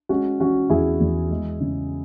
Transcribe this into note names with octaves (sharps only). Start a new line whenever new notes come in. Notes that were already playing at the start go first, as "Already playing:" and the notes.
G#3 C#4 F#4
E3 C#4 F#4
E2 E4 G#4
E2
G#3
C#3